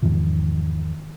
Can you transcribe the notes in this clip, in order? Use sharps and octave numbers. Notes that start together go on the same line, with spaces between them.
E2 G#2 D#3 F3